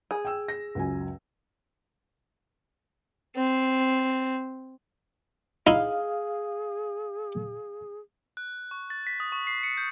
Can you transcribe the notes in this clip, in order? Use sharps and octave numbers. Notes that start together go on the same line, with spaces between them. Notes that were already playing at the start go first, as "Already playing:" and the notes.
G#4
G5 E6
A#6
C#2 F#2 G#5
C4
D#4 E4 G#4 F5
F#6
C#6
A6
B6
D#6
C#6
C7
C#7
G6